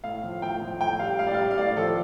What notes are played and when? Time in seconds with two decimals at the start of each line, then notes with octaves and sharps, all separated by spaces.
0.04 A2 F5
0.24 F3
0.42 A2 G5
0.62 F3
0.80 A2 G5
0.99 G3 F5
1.19 A2 F5
1.27 D5
1.34 G3 F5
1.51 F5
1.58 A2 D5
1.77 F3 A4